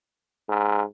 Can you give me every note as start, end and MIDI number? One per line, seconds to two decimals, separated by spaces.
0.49 0.83 44